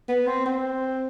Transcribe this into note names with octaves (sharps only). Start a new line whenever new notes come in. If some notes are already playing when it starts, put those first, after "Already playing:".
B3
C4
C4